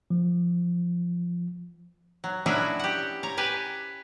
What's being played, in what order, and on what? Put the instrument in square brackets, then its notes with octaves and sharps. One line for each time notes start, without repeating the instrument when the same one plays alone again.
[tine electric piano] F3
[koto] F#3
F#3 B3 C#4 D4 E4 F#4
G4 F#5
C#5 A#5
G4 B4 G#5